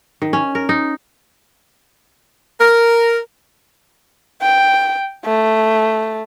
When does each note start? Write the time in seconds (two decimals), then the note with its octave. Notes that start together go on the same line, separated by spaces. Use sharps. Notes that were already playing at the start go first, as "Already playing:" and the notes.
0.22 D#3
0.33 C#4
0.55 A#4
0.69 D#4
2.60 A#4
4.42 G5
5.26 A3